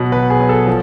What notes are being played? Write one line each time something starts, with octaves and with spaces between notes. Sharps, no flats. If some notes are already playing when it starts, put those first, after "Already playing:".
Already playing: B2 F#3 F#5
B2 B4
G#4
F#3
A4
F3